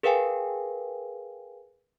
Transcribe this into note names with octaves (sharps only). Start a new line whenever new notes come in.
G#4 A#4 B4 F5 G5 G#5